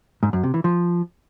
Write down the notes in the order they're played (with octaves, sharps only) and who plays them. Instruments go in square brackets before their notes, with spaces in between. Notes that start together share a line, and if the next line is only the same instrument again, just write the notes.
[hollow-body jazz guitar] G#2
F#2
C3
E3
F3